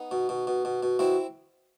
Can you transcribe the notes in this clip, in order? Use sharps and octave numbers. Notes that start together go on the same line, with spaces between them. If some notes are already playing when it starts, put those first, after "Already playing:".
Already playing: B3 D#4
B2
B2
B2
B2
B2
B2 C4 E4